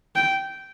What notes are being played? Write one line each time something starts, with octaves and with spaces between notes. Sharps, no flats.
G5